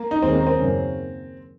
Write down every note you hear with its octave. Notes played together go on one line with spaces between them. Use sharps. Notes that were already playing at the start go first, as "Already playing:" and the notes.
Already playing: A#3
D#4
D#2 D#3 G#3 C4 C#4
A#3
C4
F#2 C#3 F#3 A#3 C#4